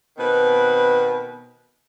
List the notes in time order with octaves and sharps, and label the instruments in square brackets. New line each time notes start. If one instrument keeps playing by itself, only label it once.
[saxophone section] B2 D#3 C4 B4